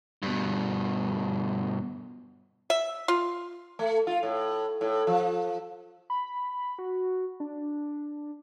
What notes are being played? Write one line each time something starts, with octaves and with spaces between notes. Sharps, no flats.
G2 B2
E5
F4
A3
F4
A2
A2
F3
B5
F#4
D4